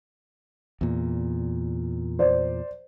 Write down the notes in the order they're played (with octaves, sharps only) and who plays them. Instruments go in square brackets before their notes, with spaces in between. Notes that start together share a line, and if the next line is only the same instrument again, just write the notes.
[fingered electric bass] E2 A#2
[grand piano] C5 D5